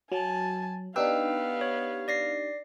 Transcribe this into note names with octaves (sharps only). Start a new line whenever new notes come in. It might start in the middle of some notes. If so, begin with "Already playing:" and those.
F#3 G#5 A5
B3 D4 D#4 G4 B4 F5 G5 E6
C#5
D5 A#6 C7